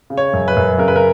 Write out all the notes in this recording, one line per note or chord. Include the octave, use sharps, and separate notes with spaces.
C#3
C#5
F#2
B4
F#2
C#3 A#4
B4
A#4